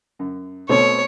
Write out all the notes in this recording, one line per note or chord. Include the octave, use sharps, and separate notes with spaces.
F#2
B2 A3 C4 C#5